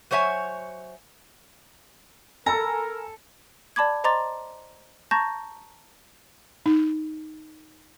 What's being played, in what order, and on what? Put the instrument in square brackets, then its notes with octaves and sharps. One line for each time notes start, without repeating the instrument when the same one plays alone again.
[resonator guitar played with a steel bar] F#3 C5 C#5 E5 G#5
[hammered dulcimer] A4 [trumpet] A#4 [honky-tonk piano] G#5 B5 E6 [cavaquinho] A#5
[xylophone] D5 A5 B5 D6 G#6
C5 D#5 A#5 C6 D6 A6
A5 A#5 C#6 G6 A6 A#6
[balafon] D#4